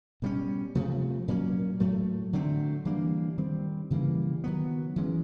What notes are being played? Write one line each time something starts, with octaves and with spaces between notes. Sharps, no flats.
B2 G3 A#3 C#4
C3 F3 A3
A#2 F#3 A#3 C#4
A2 F#3 A3
D3 F#3 A3 C4
E3 G3 A#3 D4
D#3 G3 C4
C#3 E3 G3 A#3
D#3 F#3 B3
E3 G#3 C#4